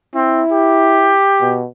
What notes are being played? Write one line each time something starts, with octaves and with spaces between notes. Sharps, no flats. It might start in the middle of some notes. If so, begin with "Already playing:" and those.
C4 E4
G4
B2